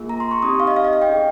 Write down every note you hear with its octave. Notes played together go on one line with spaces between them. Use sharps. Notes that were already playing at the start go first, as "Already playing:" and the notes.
Already playing: A#3 F4 G#4
A#5
C6
C#6
C4 D#4 G4 D#6
F5
D#5
F5
D#5
F5
G5
C#4 G#4